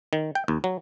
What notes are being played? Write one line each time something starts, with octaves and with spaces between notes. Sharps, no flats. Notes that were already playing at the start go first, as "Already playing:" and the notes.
D#3
G5
D#2
F#3